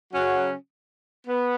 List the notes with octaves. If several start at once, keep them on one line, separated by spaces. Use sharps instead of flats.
C#3 F#3 C#4 F#4
B3